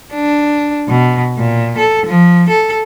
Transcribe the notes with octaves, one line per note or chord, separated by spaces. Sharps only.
D4
B2
A#2
A4
F3
A4